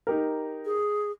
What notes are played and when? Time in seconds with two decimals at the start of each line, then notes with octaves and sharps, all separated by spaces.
0.07 D#4 G4 A#4
0.65 G#4